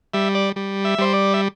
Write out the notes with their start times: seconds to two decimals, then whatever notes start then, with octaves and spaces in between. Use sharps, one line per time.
0.14 G3 E5
0.35 D5
0.56 G3
0.85 E5
0.99 G3 C5
1.13 D5
1.34 E5